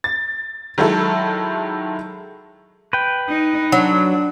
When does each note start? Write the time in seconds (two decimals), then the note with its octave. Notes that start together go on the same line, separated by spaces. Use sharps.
0.04 A6
0.78 D#3 F#3 G#3 E4 A4
2.93 B4 G5
3.29 D#4
3.72 F#3 D4